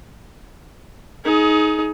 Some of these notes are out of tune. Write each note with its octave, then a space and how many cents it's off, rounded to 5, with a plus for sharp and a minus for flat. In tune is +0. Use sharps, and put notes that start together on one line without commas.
D#4 +15 G#4 +30